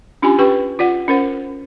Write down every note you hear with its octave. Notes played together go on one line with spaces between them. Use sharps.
C#4 D4 F4 G4 G#5 B5
C#4 G4 B4 G5 C#6
F4 D5 F#5
C#4 A#4 C5 F#5